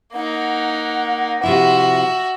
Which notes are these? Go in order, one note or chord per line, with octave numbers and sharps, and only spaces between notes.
A#3 D#4 F#5
C3 F3 E4 F#4 E5